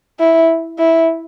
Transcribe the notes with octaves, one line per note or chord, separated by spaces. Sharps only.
E4
E4